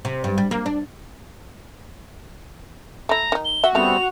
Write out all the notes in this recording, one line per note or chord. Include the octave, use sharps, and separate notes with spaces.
C3
G2
G3
A#3
D4
A3 E4 A#5
D#3 D#4
G7
F#4 E5
C#3 G3 A3 B3 C4 F7